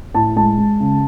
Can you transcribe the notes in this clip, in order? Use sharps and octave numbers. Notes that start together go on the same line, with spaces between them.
A2 A5
G#3 A5
G#3
C#3